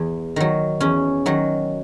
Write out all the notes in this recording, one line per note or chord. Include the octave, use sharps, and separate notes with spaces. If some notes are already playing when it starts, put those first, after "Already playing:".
Already playing: E2
D#3 F#3
E2 C#4
D#3 F#3